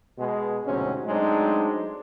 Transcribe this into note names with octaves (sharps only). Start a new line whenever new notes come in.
B2 G#3
D2 G#2 C3 F#3 C4 C#4
F#3 G#3 A3 C4 D4 D#4